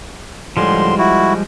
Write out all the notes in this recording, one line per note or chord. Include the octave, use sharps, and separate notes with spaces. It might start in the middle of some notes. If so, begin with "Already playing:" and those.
A2 D3 F3 G3 G#3 C6
E4 F#4